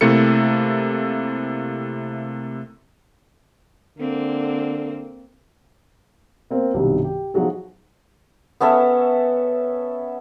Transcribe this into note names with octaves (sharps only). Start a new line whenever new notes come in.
C3 A3 A#3 E4 A4 C#7
D3 A#3 C4
A#3 C4
B1 G2 C3 D#3 G3
G4
F3 F#3 D#4 F#4 G#4
B3 C#4 A4 E5